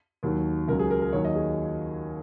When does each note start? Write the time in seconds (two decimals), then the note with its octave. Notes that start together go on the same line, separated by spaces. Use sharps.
0.23 D#2 D#3 F#3
0.68 C#2 C#3 F#3 A#4
0.79 G#4
0.91 A#4
1.01 A#4
1.13 D#2 D#3 F#3 C#5
1.25 D#5
1.35 G#4